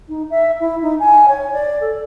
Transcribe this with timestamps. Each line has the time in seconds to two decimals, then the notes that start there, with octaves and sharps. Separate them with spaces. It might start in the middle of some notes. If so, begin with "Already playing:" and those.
0.08 D#4
0.30 E5
0.60 E4
0.82 D#4
0.99 G#5
1.28 C#5
1.53 D5
1.81 A4